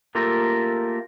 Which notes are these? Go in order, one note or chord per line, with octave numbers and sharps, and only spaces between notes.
A3 A#3 F4 G4 A4 A#4